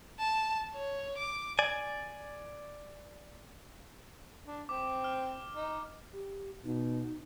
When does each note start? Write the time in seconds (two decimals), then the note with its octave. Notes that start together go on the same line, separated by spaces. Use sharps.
0.20 A5
0.73 C#5
1.18 D6
1.59 D5 G#5
4.47 D4
4.69 C4 D6
5.04 F6
5.56 D#4
6.13 G4
6.64 B2 D#4